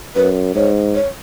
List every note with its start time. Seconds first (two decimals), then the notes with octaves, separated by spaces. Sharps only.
0.16 F#2 B4
0.55 G#2 C#5
0.95 C#5